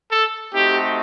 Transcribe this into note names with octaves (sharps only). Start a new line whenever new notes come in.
A4
A3 C4 D#4 F#4 G4